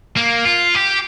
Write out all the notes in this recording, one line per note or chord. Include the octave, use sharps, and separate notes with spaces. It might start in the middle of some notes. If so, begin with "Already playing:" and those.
A#3
F4
G4